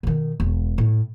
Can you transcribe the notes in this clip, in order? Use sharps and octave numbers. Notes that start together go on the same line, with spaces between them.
B2 D#3
E1
A2